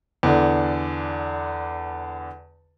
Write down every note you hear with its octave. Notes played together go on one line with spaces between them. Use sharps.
E2 D3 D4